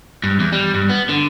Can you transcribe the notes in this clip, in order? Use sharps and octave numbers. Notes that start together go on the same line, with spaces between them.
G2
E2
G3
G2
B3
D3